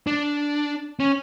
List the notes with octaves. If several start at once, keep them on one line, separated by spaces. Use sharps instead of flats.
D4
C#4